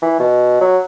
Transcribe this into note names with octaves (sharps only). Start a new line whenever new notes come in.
E3
B2
F#3